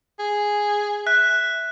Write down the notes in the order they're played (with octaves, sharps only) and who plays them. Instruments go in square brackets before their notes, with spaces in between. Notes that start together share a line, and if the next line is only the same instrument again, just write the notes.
[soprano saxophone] G#4
[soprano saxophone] E5 [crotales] F#6